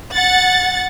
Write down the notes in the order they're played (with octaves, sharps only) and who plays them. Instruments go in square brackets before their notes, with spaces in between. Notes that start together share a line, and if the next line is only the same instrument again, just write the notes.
[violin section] F#5 A6